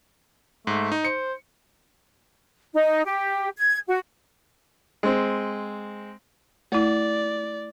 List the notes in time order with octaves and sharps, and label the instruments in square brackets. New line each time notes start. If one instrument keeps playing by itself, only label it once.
[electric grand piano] G#2 [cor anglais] A3
[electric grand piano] D#4
[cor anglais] C5 [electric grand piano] C#7
[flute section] D#4
G4
G#6
F#4
[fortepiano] G#3 C4
[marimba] A3 E4 [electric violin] D5